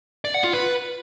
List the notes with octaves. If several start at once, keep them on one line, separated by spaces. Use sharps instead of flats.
D5
F#5
F4
B4